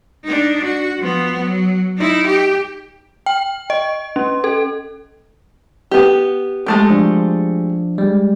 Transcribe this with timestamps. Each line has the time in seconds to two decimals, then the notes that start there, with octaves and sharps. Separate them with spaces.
0.24 D4 D#4
0.63 F#4
0.99 F3 B3
1.38 F#3
1.97 D#4 E4
2.27 G4
3.26 G5
3.70 D#5
4.16 C#4
4.44 A4
5.91 B3 G4
6.66 G#3 A3 G4
6.90 F3 D4
7.98 G3 G#3